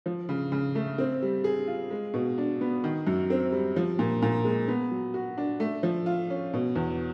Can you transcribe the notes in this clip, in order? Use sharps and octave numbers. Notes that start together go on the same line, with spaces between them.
F3
C#3
C#3
A3
C4
G3
G#4
F4
G#3
B2
D4
B3
D#3
F#2
C4
G3
F3
A#2
A#2
G#3
B3
F#3
F#4
D4
A3
F3
F4
C#4
B2
E2